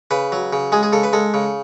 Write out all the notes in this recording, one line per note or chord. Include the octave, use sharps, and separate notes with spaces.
C#3 B4
F#3
C#3
G#3 G#4
G#4
C#3 A4
B4
G#3 A4
C#3